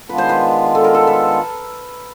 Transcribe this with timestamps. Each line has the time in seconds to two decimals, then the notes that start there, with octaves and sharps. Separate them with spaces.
0.09 D#3 G#3 B3 D4 F4 B4
0.18 C5
0.29 B4
0.75 A4
0.84 A#4
0.95 A4
1.07 B4